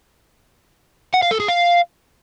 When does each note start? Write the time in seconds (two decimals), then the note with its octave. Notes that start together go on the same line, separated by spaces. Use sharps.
1.14 F#5
1.23 F5
1.31 A4
1.40 G#4
1.48 F5